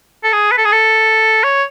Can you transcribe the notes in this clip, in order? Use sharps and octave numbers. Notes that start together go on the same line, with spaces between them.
A4
G#4
B4
A4
G#4
A4
C#5